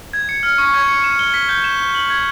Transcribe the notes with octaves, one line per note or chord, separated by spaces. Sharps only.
G#6
C#7
F6
C#6
G#6
C#7
E7
G7
B6
G6
E7
G7
F#7
G#6